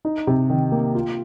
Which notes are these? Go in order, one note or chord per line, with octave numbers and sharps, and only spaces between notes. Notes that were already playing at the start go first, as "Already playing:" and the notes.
D#4
C3
D#3
A#3
F4